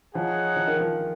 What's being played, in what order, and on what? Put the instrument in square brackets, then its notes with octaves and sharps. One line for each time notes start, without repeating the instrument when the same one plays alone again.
[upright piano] F3 [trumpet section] D#4 G#4 C#5 F#5
[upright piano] F3
D#3
F3